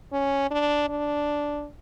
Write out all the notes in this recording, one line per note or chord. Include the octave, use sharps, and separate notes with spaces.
C#4
D4
D4